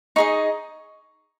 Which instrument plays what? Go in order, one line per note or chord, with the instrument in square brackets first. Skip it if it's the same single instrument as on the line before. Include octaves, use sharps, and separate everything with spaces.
[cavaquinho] D#4 G#4 D#5 C#6